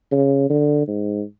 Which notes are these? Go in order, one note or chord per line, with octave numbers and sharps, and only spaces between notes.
C#3
D3
G#2